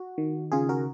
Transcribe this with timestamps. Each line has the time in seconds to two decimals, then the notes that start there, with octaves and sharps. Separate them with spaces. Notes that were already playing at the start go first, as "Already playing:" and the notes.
Already playing: F#4
0.18 D#3
0.52 C#3 F4 G#4
0.69 F#4 A#4